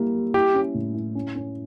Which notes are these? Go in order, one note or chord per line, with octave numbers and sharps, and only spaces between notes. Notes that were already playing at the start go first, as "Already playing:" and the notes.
Already playing: G3 A#3 E4
G3
E4 G4
C#4
A2
E4
C#4
C#4